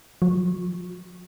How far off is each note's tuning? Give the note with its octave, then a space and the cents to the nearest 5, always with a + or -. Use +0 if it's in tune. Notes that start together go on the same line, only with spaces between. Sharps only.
F3 +40